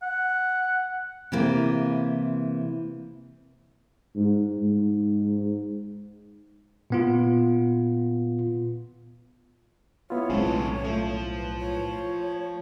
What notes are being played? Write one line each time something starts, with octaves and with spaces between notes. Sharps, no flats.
F#5
C3 E3 A#3
G#2
G#2
A#2 B3 F4
B3 E4 F4 C#5
B1 A2 C#3 G#3 C4 C#4 A4
F3 A3
B4
C#5